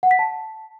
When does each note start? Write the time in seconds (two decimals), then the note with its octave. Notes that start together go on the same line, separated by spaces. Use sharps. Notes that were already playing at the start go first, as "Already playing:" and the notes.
0.03 F#5
0.11 B6
0.19 A5